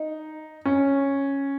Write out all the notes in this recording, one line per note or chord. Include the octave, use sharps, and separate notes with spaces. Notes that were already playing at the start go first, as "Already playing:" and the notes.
Already playing: D#4
C#4